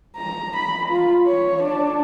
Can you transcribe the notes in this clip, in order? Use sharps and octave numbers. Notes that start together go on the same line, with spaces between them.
A#5
B5
F4
C#5
D4